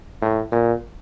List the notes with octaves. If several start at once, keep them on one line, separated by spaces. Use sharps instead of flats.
A2
A#2